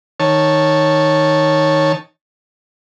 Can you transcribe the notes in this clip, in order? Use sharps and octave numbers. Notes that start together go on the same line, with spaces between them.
D#3 C#5 A5